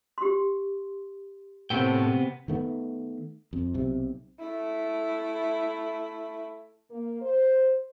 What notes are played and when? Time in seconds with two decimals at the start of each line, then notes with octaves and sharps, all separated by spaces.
0.18 G4 C6
1.70 A2 C3 B3 A#4 C5 G5
2.48 D#3 A3 B3
3.53 F2
3.74 B1 C3
4.39 A3 E4
6.91 A#3
7.21 C5